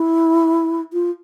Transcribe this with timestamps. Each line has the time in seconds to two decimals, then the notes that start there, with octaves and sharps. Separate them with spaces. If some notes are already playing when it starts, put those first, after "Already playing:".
Already playing: E4
0.93 F4